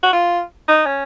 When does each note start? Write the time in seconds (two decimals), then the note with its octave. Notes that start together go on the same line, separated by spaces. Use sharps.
0.03 F#4
0.13 F4
0.68 D#4
0.86 C#4